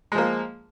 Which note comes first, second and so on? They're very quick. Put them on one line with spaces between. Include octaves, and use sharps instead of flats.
G#3 F3 A#3